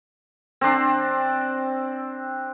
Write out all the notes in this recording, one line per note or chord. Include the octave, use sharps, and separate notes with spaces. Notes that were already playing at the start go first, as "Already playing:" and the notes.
C4 D4